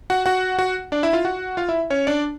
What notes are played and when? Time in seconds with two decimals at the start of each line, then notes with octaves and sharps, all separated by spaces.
0.10 F#4 F#5
0.26 F#4 F#5
0.58 F#4 F#5
0.92 D4 D5
1.03 E4 E5
1.13 F4 F5
1.25 F#4 F#5
1.57 F4 F5
1.69 E4 E5
1.90 C#4 C#5
2.07 D4 D5